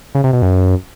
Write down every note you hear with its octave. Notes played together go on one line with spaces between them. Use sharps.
C#3
C3
B2
F#2